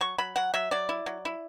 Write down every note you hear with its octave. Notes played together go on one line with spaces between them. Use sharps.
F#3 C#6
F#3 B5
F#3 F#5
F#3 E5
F#3 D5
E4
F#3
E4